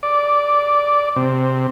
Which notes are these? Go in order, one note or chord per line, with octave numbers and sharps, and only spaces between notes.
D5
C3